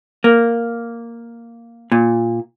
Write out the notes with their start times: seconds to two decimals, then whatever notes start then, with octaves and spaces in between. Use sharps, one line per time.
0.24 A#3
1.92 A#2